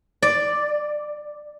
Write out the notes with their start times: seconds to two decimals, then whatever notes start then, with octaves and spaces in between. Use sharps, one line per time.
0.22 D5